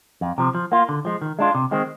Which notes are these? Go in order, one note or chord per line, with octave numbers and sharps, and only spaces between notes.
F2
C3 F3
F3
A#3 F4
D3
F3 G#3
D#3
G#3 D4 F4
C3
D#3 G#3 C4